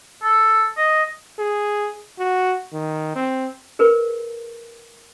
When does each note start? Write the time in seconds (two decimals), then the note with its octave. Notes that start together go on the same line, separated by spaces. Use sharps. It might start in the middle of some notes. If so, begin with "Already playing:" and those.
0.23 A4
0.77 D#5
1.39 G#4
2.19 F#4
2.73 D#3
3.16 C4
3.79 G#4 A#4 B4